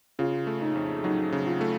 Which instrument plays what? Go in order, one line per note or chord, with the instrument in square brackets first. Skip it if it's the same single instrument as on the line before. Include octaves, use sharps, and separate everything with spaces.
[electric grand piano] C#3 [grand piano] F4
[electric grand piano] A3
[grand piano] D#4
[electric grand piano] F2
[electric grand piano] F#3 [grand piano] D#4
[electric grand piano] C#3
[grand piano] F4
[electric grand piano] A3